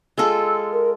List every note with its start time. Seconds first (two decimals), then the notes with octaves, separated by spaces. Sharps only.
0.17 G#3 F4 A4 E6
0.72 A#4